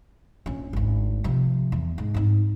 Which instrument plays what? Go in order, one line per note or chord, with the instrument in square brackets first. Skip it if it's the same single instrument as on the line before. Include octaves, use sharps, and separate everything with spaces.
[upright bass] A#1 C#4
G#1 D2
C3 F3
E2
G#2
G#2 C4